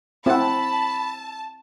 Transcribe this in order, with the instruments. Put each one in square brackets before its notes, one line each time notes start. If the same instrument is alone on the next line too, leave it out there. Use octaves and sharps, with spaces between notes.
[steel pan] C4 [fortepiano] E4 F#5 [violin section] A5 [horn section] B5